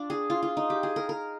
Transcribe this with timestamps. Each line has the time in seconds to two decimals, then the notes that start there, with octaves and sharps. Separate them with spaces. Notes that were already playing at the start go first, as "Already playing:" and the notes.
Already playing: D4 F4
0.10 G#4
0.30 F4
0.43 F4
0.57 D#4
0.70 G4
0.83 G#4
0.96 A#4
1.09 A#4